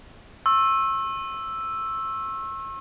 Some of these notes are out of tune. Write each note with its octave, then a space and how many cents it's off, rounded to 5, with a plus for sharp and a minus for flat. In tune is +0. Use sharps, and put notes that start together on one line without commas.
C#6 -40 E6 +0